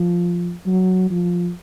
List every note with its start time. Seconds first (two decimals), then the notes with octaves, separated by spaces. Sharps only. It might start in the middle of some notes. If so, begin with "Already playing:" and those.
Already playing: F3
0.66 F#3
1.11 F3